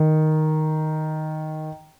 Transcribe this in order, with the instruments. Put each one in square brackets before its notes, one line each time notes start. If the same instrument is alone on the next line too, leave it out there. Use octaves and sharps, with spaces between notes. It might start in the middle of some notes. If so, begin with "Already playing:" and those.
Already playing: [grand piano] D#3